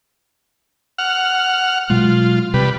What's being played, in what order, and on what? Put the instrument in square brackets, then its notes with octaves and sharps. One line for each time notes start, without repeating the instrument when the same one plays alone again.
[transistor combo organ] F#5 F6
[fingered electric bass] B2 F#3 G#3 [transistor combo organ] F4
[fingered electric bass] C3 [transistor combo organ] G3 B4